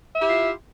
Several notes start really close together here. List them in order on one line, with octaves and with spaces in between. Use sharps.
E5 E4 G4 F4